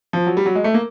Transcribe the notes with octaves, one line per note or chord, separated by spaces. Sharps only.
F3
F#3
G3
F#3
G#3
A3
A#3